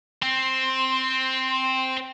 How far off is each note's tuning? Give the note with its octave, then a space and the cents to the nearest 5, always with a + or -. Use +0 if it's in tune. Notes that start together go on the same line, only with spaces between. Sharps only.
C4 +0 C6 +15